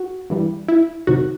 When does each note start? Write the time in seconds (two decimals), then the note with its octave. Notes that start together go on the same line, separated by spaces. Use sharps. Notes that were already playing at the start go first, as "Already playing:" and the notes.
Already playing: F#4
0.30 G2 E3 G3
0.68 E4
1.07 C2 C3 D#3 F#3 F#4